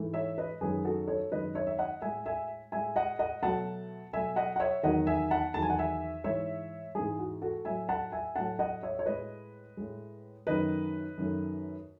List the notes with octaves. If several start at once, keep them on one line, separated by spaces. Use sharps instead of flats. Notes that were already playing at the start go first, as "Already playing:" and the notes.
Already playing: G#2 E3 A3
C#5 E5
B4 D#5
F#2 D#3 G#3 G#4 B4
F#4 A4
A4 C#5
F#2 D#3 G#3 B4 D#5
C#5 E5
E5
D#5 F#5
A2 G#3 E5 G#5
E5 G#5
A2 G#3 E5 G#5
D#5 F#5
D#5 F#5
B2 F#3 A3 F#5 A5
B2 F#3 A3 E5 G#5
D#5 F#5
F#5
C#5 E5
E2 D#3 F#3 D#5 F#5
E5 G#5
F#5 A5
E2 D#3 F#3 A5
G#5
F#5
E5 G#5
G#2 E3 G#3 C#5 E5
G#2 E3 G#3 G#4
F#4
F#4 A4
A2 F#3 A3 E5 G#5
F#5 A5
E5 G#5
A2 F#3 A3 F#5 A5
D#5 F#5
C#5 E5
C#5
A2 G#3 B4 D#5
A2 G#3
F#2 D#3 A3 B4 D#5
F#2 D#3 A3